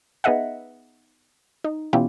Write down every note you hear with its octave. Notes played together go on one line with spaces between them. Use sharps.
B3 D#4 G#4 D#5 E5 F#5
D#4
B2 E3 C#4 E4 F4 G4